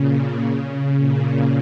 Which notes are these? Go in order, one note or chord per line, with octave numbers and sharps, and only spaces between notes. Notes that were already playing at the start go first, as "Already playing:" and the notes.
Already playing: A#2 C#3
C#3
A#2